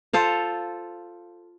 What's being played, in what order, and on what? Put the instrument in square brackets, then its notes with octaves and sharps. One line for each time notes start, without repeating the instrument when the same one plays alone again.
[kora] F4 A4 C5 F5